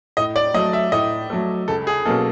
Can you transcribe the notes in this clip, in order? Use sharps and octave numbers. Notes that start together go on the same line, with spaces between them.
A2 D#5
D5
F#3 A3 D#5
E5
A2 D#5
F#3 A3
C#2 A4
G#4
B2 F#3 A#3 C#4 A4